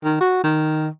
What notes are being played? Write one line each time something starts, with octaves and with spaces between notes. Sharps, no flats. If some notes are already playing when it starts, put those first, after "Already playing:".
D#3
F#4
D#3